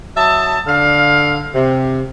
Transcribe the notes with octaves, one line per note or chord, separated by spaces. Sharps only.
F#3 D#5 E5 A5
D3 F5
C3